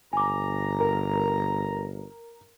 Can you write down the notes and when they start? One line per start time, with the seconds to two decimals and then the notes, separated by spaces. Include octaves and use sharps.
0.13 G1 G#5 A#5 D6
0.80 A#4